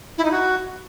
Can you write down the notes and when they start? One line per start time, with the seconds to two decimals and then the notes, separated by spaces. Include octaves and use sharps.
0.18 E4
0.25 D#4
0.31 F#4